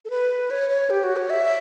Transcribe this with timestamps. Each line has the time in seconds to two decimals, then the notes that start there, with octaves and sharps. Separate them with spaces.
0.05 A4
0.10 B4
0.51 C#5
0.70 C#5
0.90 G4
1.04 F#4
1.16 C#5
1.30 E5